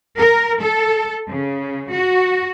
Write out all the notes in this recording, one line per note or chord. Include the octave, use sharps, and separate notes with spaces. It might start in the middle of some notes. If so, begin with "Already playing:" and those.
A#4
A4
C#3
F#4